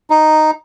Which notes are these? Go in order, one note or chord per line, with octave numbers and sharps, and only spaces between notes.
D#4